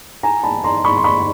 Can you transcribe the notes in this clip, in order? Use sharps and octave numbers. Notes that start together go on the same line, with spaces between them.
G#5 A#5
A5 B5
A#5 C6
B5 C#6
C6
B5 C#6